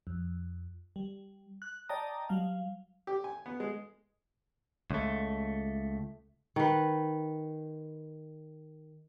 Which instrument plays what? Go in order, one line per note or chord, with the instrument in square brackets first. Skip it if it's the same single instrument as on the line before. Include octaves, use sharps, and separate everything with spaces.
[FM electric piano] F2
G3
F#6
D5 D#5 G5 A5 A#5 D#6
F#3 G3 F5
[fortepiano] G4
G#5
B3
G#3
[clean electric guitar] C#2 A3
[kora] D#3 B4